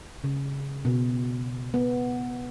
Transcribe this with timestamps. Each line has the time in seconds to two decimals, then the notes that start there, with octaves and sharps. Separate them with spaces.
0.24 C#3
0.85 B2
1.74 B3